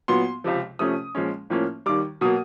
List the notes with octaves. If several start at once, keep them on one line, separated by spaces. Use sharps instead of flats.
A#2 F#3 B3 C6
C#2 C3 F3
C3 F3 A3 C#4 D#6
A#2 F3 G#3 C#4
A2 F3 A#3 C#4
D#2 D#3 G3 D6
B2 F#3 A#3 D#6